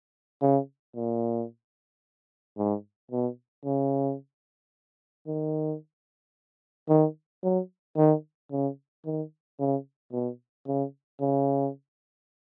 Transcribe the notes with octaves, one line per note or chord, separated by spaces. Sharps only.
C#3
A#2
G#2
B2
C#3
D#3
D#3
F#3
D#3
C#3
D#3
C#3
B2
C#3
C#3